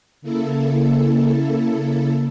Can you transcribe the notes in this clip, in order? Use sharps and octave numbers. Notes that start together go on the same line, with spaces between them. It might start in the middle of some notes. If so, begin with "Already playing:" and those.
C#3 A#3 E4 A4